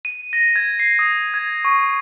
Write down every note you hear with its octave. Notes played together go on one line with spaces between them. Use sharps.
D#7
A#6
G#6
C7
D#6
G#6
C#6